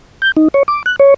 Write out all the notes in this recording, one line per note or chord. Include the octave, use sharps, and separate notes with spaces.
G6
D#4
C#5
D6
F#6
C#5